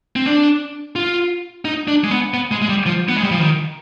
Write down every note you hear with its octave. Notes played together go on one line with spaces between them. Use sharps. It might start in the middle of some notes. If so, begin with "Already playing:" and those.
C4
D4
F4
D#4
D4
G#3
B3
B3
G#3
G#3
G3
F3
B3
G#3
G3
F3
D#3